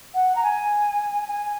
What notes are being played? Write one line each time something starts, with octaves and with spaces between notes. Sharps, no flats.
F#5
A#5
G#5
G#5